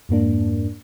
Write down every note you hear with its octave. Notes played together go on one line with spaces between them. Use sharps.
F2 G#2 A#3 D4